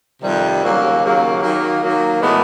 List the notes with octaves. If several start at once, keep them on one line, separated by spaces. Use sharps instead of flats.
F2 C3 D#3 G3
D#2 C#3 F#3 A#3
D#2 C#3 F#3 A#3
D#3 F#3 A#3
D#3 F#3 A#3
A2 E3 G#3 B3